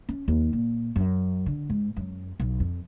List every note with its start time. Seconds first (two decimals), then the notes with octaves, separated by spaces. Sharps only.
0.09 C#4
0.28 D#2
0.53 A#2
0.96 F#2
1.46 D3
1.70 G#2
1.97 F#2
2.40 B1
2.60 F2